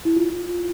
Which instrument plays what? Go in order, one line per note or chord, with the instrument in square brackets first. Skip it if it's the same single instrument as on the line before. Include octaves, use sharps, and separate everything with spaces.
[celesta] E4
F4